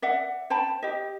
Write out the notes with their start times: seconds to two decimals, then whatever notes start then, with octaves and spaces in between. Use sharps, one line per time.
0.02 D5 E5 F#5
0.50 C5 G5 A5 B5
0.83 G4 D#5